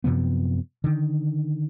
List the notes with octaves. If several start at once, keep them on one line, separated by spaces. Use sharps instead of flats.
F#2 C3 F3 B3
D3 D#3